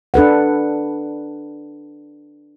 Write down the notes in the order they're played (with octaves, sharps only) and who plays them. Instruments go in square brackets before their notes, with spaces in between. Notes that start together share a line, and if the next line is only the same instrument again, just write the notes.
[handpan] D4 A4 B4 F#5